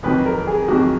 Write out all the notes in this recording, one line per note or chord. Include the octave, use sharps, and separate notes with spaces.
F2 D#3 F#3 B4
A#4
G#4
F2 D#3 F#3 F#4